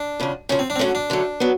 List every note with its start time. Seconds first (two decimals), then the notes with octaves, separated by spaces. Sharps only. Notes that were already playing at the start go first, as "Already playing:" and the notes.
Already playing: D4
0.20 E2 C#3 F3
0.49 E2 C#3 F3 C#4
0.59 C4
0.70 D4
0.76 C4
0.79 D3 F#3 A3 C#4
0.95 D4
1.10 D3 F#3 A3
1.40 F#3 B3